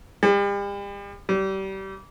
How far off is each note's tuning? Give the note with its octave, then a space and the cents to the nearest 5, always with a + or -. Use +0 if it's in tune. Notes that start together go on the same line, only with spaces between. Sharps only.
G3 +45
G3 -25